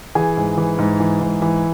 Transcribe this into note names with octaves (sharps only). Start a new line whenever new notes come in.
E3 G#4 G#5
G#2
E3
G#2
E3
G#2
E3